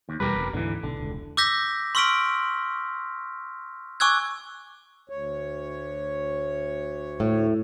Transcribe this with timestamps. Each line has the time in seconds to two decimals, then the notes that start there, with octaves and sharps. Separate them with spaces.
0.09 D#2
0.20 E2 B2 G3 G4 A#4 B4
0.34 F1 F#2
0.54 D2 G#2 D3 E3 B3
0.84 B1 D3
1.00 E1 C#2
1.37 D6 E6 G6 A#6 B6
1.95 C6 C#6 E6 F6 B6 D7
4.00 G#5 C#6 D6 E6 F#6 G#6
5.10 D2 C#5
7.20 A2